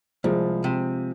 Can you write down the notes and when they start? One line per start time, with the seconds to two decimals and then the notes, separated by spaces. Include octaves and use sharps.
0.24 C2 F3 G#3
0.64 C3